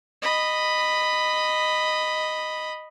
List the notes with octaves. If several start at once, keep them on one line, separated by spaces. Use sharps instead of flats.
D#5 B5